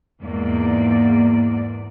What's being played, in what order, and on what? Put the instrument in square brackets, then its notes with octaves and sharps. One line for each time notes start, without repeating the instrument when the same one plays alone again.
[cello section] E2 G#2 A#3 D5